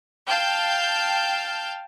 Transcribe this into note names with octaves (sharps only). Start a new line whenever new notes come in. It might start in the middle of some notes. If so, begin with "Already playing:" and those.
F5 G5 A5 F6 G6